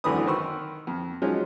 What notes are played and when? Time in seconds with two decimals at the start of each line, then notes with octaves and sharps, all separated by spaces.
0.04 G#1 F#2 D3 E3 B4 D#6
0.26 D#3 B4 C5 C#6 E6
0.87 F2
1.22 F3 F#3 G#3 C#4 D#4